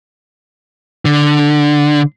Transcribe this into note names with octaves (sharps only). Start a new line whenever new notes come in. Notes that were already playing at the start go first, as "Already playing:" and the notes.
D3